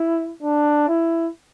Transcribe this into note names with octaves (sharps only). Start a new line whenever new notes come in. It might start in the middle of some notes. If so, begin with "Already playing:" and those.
Already playing: E4
D4
E4